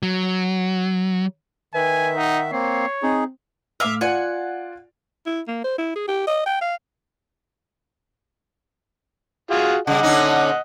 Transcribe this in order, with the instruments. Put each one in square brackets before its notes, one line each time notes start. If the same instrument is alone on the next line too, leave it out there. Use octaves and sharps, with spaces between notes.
[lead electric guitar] F#3
[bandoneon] D#3 E5 [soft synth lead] B4 [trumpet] G#5
[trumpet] D#4 [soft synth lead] F#5
[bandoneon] A#3 C4 [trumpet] C#5 [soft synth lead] C7
[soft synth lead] C4 [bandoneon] D#4 G#4
[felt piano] A2 D6 F6 [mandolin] E5 F5
[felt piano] F4 D5 [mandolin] F#5 G#5
[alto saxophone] E4
A#3
C5
E4
G#4
G4
D#5
G5
F5
[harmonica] F4 F#4 G#4
[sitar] C#3 G3 [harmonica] D#5 F#5
[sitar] D3 C#4 D#4